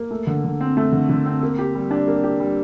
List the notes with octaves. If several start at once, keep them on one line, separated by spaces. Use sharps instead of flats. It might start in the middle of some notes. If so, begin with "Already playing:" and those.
Already playing: A#3
A3
D3
D3
C4
A3
D3
D3
C4
A#3
G4
G3
D4
A#3
G4
G3